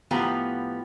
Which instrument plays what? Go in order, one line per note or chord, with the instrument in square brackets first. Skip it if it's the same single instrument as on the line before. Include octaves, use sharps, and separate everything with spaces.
[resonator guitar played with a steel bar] A2 F3 B3 F4 G4 A#5